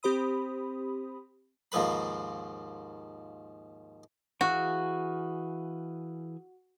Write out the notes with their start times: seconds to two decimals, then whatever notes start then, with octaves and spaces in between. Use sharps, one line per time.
0.03 C4 G4 C5 B5 D#6
1.72 D#2 G#2 F3 B4 B5
4.41 E3 F#4 G#4 F5